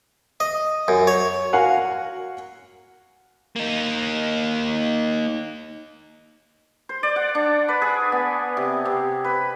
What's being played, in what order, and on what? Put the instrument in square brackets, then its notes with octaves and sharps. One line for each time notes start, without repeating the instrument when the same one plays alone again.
[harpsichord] D#5
F#2
C#5
[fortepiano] F#4 A#4 F5 F#5 G#5
[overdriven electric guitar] A#3 D#4
[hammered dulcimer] C5
D5
F#5
D4
B4
G#4
B3
C3
C3
B4